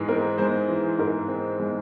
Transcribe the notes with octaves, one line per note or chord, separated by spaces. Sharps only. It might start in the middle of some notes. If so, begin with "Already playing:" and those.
Already playing: G#2 E3 G#3
C4 A#4
G#3 C5
E3
G#2 A#4
C4
G#3